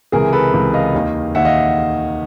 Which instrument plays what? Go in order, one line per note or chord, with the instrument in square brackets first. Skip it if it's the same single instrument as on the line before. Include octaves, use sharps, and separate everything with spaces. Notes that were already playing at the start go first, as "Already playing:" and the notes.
[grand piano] C#2 C3 E3 G#4 A#4
A4 B4
C#2 C3 E3
D#5 F5
D#2 D#3
D#2 D#3 E5 F#5
D#5 F5